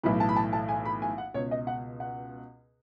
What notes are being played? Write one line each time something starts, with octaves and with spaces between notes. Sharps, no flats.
B1 A2 E3 B5
A5
B5
A5
A5
G#5
B5
G#5
F#5
C#2 B2 C#5
D#5
F#5
F#5